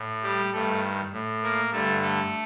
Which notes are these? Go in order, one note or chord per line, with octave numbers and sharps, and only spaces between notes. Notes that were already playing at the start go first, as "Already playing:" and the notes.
Already playing: A2
G3 G4
G2 D#3 A3 A4
A2
A#3 A#4
G2 D3 A3 A4
A3 A4